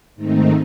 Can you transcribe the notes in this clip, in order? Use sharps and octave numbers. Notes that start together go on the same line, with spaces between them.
G#2 D#3 A3 C4 D#4